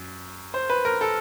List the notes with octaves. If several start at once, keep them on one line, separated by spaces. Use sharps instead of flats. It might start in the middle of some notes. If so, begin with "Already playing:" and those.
Already playing: F#2
C5
B4
A#4
A4